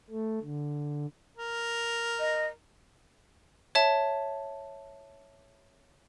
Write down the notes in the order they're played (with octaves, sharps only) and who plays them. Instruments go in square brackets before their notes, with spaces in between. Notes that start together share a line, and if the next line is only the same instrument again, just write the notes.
[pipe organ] A3
D3
[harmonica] A#4
[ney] D#5
[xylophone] C#5 E5 A5